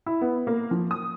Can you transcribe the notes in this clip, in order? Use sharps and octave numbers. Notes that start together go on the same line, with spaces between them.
E4
B3
A#3
F3
D#6